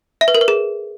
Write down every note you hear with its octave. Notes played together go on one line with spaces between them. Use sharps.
E5
B4
A#4
B4
G#4